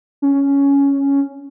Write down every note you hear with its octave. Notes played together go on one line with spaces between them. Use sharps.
C#4